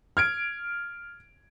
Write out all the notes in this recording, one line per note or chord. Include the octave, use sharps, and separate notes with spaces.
F6 G#6 D7